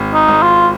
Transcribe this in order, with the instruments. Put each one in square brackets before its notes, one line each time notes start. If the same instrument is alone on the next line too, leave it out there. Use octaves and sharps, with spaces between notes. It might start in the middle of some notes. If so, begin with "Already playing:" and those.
Already playing: [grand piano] G#1
[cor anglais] D#4
[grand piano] G#1
[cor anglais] F4